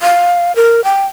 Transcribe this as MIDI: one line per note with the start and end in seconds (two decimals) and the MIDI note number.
0.02 0.55 77
0.56 0.83 70
0.84 1.06 79